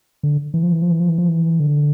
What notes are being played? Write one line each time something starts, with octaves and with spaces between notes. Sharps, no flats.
D3
E3
F3
E3
F3
E3
F3
E3
F3
E3
D3